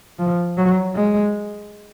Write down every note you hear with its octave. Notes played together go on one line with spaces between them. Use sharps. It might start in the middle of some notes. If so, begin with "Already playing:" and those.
F3
F#3
G#3